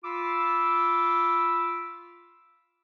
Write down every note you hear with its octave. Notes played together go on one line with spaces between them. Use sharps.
F4 B5 D6 E6